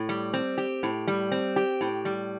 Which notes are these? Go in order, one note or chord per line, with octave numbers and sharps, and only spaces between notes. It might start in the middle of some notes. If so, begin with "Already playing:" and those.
Already playing: A2
G3
C4
G4
A2
G3
C4
G4
A2
G3